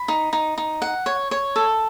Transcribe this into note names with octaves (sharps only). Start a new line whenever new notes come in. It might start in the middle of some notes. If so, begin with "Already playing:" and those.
Already playing: B5
D#4
D#4
D#4
F#5
C#5
C#5
A4